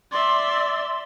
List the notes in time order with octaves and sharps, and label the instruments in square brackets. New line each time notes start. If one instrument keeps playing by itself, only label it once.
[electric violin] D5 E5 [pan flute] C6